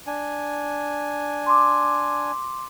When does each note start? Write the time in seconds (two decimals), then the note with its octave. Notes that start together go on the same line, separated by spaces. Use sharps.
0.07 D4 G#5
1.46 C6 D6